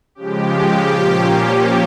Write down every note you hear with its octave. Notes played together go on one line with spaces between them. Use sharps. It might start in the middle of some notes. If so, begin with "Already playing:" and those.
C#3 F3 G#3 G4
A#2 F3 A#3 C#4